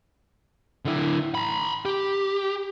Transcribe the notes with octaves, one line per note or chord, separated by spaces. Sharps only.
D3 E4
A#5 B5
G4